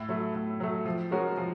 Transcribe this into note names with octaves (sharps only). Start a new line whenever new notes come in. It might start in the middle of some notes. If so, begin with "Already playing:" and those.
Already playing: A2
F#3 A3
A2
F#3 A3
F3
G#3 C#4 F#4 A#4
F3